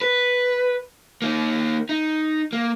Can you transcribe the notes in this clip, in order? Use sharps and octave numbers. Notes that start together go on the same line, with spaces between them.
B4
A#3 D#4
D#4
A#3